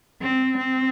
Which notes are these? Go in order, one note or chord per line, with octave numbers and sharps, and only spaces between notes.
C4
C4